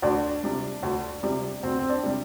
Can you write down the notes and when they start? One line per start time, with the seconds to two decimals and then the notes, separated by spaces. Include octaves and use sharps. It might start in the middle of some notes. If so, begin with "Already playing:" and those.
0.02 D2 D4
0.43 C3 G3
0.83 D2
1.23 C3 G3
1.63 D2 C4
1.79 C4
1.89 D4
2.03 C3 G3